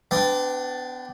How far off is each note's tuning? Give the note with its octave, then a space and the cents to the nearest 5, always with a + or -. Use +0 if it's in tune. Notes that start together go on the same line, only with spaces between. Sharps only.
B3 +35 D4 +0 G5 +0